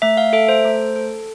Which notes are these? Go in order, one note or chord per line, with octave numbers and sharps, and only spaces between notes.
A3 E5
F5
A4 E5
C5
A3
A4